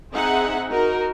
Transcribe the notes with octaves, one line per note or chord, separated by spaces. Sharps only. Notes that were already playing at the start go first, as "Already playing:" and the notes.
C4 D#4 G#4 E5 F#5
D#4 F#4 A#4